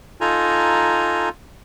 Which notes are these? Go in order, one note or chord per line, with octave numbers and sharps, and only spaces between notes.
D#4 F4 A4 G#5 A#5